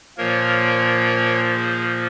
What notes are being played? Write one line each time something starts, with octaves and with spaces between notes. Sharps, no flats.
A#2 F3 A#3 A#4 C#5
G#4 C5